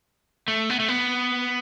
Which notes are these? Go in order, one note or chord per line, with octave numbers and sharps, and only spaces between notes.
A3
B3
A3
B3